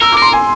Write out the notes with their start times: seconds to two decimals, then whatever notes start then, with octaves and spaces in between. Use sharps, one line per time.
0.01 A#4 E6
0.12 D6
0.17 A#4 C6
0.33 G#5